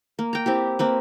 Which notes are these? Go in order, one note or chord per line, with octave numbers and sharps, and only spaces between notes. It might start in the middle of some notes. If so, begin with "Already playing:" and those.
A#3
G5 A#5
C4 E4 G4
A#3 C4 B4